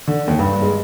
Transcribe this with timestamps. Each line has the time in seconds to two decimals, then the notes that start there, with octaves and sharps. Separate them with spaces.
0.07 D3
0.28 D#2
0.39 G2
0.62 G#3